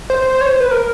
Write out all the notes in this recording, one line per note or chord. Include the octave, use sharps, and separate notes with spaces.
C5
C5
C5
C#5
C5
B4
A#4